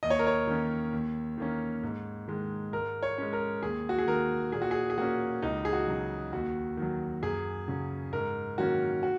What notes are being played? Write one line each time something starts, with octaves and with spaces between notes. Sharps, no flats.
D#2 D#5
C#5
A#4
C#5
D#3 A#3 C#4
D#2
D#3 A#3 C#4
G#2
D#3 G#3
G#2 A#4
C#5
G#3 C#4
A#4
D#2 G#4
F#4
G#4
D#3 A#3 A#4
A#2 G#4
F#4
G#4
G#4
A#3 C#4 F#4
C#2 D#4
G#4
F#4
C#3 F#3
D#2 F#4
D#3 F#3
F#2 G#4
C#3 F#3 C#4
G#2 A#4
D#3 F#3 A#3 C#4 F#4
F#4